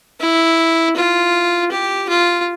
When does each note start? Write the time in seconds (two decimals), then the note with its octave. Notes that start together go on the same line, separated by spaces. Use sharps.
0.20 E4
0.96 F4
1.71 G4
2.09 F4